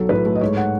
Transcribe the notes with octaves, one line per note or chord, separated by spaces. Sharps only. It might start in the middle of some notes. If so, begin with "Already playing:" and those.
Already playing: B1 F#3 A4
A2 B4
A3
D#5
G#2 C#5
F#5